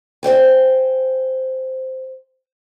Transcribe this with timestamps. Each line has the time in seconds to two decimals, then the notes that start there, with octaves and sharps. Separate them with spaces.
0.23 C5 C#5 G5 G#5